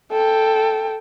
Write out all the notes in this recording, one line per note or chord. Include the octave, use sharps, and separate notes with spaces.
A4 G5